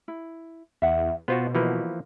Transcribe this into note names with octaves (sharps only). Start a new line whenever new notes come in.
E4
E2 E5 F#5
B2 B3 F4 F#4 C5
E3 F3 A#3 F#4 B4